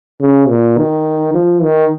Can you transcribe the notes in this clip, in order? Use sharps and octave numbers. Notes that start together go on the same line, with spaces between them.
C#3
A#2
D#3
F3
D#3